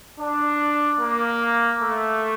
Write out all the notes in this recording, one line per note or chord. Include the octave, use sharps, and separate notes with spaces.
D4
A#3
A3